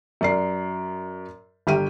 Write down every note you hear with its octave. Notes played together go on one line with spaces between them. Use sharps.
F#2 D5 C7
G1 G4 G5 D#7